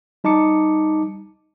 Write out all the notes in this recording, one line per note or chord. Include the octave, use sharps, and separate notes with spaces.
G3 D#4 A5 D6 C#7